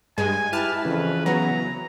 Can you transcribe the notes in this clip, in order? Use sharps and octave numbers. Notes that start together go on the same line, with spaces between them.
G2 G#3 G#5
E4 G4 B4 A5 F6
F2 C#3 E3
F#3 B3 A#5